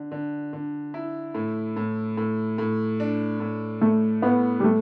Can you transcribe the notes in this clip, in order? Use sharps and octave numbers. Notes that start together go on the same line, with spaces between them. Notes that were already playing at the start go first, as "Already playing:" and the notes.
Already playing: D3
D3
D3
E4
A2
A2
A2
A2
D4
A2
A2 A3
A2 B3
G3
A2 A3